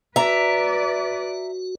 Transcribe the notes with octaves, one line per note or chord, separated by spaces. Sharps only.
F#4 B4 D5 E5 A#5